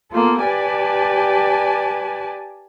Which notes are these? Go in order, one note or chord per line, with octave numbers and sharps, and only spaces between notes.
A#3 B3 F4 A4
G4 B4 D5 G#5 A5